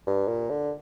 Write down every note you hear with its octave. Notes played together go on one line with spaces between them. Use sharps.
G2
A#2
D3